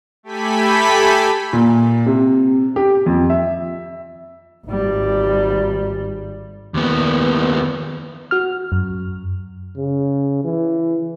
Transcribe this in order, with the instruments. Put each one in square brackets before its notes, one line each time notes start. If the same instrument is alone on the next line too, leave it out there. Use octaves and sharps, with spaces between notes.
[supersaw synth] A3 G4 A4 G#5 B5 B6
[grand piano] A#2
C3
G4
F2
E5
[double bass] G#1 G3
[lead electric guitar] D#2 B3
[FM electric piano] F#4 F6
F#2
[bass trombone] C#3
E3